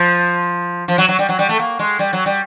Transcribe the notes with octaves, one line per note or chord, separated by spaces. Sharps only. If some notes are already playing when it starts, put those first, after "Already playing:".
Already playing: F3
F3
F#3
F#3
G3
F#3
G3
A3
A#3
G#3
G3
F#3
G3